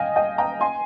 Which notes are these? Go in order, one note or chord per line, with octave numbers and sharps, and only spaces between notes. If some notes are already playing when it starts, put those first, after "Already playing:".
Already playing: D#5 F5 G5 G#5
D#5 G5
G5 A#5
G#5 C6